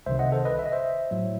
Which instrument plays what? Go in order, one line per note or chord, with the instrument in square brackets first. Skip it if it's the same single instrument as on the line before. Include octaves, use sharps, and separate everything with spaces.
[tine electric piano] C2 C3 D#3 C5 E5
D#5 F#5
A4 C5
B4 D#5
E5
D#5
C5 E5
A2 F#3